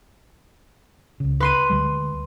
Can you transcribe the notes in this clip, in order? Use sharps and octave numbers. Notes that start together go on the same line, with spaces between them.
C#2 C#3
B4 C6 D#7
D2 G3 G#3